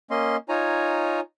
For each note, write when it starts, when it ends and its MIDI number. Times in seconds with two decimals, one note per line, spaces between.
0.11 0.37 58
0.11 0.37 61
0.11 0.37 75
0.11 0.37 84
0.49 1.20 63
0.49 1.20 65
0.49 1.20 73
0.49 1.20 80
0.49 1.20 82